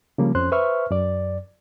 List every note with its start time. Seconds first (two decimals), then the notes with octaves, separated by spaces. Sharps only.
0.18 C#3 F3 G3 A#3
0.35 F2 C#4 C5 C6 F#6
0.52 B4 C5 E5 C#6 F6
0.91 F#2 D5